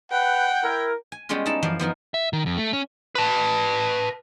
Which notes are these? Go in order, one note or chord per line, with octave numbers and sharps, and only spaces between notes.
B4 F#5 G5
E4 A#4
G#5
G3 G#3 B3 C#4 F4
D#4 E4 A5
F#2 E3 F3 F5
F3 B3 D#4 A#4
E5
D#3
F2
A3
C#4
B4 A5